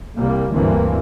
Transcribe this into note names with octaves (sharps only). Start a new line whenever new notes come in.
C2 G3 A#3
D2 G2 E3 A#3 C4